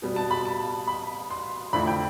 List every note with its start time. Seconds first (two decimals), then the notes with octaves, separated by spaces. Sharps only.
0.02 B2 G3 B3
0.16 A5
0.31 B5
0.45 A5
0.88 B5
1.30 C6
1.73 F2 D3 A3 E4 B5
1.87 G5